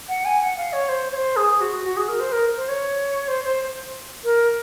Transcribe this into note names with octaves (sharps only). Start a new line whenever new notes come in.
F#5
G#5
F#5
F5
C#5
C5
C#5
C5
G#4
F#4
F#4
G#4
A#4
C5
A#4
C5
C#5
C5
C5
A#4